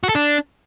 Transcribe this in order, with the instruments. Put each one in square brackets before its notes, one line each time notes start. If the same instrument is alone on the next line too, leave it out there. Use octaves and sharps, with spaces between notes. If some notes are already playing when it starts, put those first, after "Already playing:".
[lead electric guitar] F#4
A4
D4